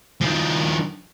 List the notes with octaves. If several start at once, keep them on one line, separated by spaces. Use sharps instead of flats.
D#3 F3